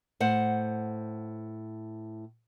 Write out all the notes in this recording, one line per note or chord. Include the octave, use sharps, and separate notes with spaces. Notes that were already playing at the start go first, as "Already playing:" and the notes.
A2 C5 F#5